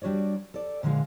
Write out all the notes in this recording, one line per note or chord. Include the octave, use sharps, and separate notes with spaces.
G3 D4 F#4 C#5 D5
A4 D5
A#2 D3 F3 G#3 F5